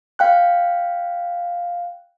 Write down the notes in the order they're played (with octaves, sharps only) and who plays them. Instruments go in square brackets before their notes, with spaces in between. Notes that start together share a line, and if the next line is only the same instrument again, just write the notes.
[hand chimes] F5 G5 F#6